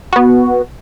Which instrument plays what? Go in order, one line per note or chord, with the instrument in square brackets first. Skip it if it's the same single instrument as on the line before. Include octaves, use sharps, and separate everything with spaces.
[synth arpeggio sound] B3 F#4